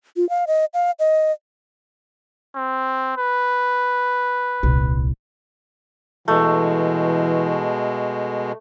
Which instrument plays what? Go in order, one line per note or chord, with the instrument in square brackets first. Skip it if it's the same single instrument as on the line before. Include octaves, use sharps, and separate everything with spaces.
[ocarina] F4
F5
D#5
F5
D#5
[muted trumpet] C4
B4
[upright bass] D#1 C2
[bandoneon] B2 G#3 [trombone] E3 [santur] A3